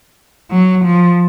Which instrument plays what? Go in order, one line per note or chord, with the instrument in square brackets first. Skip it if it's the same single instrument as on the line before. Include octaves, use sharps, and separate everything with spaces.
[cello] F#3
F3